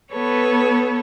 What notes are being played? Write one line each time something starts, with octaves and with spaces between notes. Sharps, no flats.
B3 A4 B4 C#5